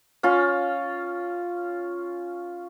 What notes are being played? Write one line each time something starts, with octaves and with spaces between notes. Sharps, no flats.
C#4 F4